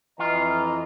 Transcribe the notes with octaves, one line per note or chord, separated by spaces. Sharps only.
F2 E3 F4 D#5 A#5